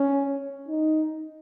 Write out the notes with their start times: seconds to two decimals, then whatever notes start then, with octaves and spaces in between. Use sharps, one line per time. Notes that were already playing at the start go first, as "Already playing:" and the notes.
Already playing: C#4
0.68 D#4